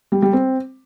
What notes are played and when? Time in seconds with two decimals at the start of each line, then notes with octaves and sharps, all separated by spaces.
0.12 G3
0.22 G3
0.33 C4